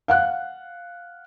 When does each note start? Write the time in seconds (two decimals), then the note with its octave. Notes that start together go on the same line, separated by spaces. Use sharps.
0.08 F5 F#5 F#6